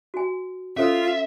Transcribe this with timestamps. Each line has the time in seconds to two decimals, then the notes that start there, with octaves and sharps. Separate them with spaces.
0.14 F#4 G#5
0.77 C#4 F4 A4 C5 E5